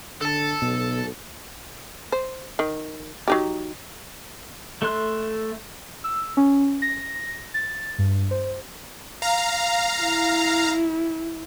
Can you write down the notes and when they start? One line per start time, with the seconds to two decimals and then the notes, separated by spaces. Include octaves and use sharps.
0.21 D3 A4 A5
0.62 B1 B2
2.12 C5
2.59 D#3
3.28 F#3 D#4 G4
4.82 A3 A4 E5 C6 F#6
6.04 E6
6.37 C#4
6.82 A#6
7.54 A6
7.98 G2
8.31 C5
9.22 F5 A#5
10.02 E4